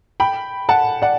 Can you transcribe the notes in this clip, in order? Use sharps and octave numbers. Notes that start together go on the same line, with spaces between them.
G5 B5
F#5 A5
D5 F#5